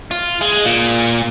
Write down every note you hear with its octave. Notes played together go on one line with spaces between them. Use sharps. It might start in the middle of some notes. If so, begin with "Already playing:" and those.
F4
G#3
A#2